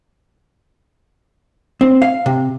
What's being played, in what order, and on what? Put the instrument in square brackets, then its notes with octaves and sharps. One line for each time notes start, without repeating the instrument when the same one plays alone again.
[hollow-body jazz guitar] C4
F5
C3